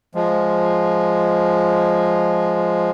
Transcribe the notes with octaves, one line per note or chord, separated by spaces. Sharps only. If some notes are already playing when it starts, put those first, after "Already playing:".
F3 G#3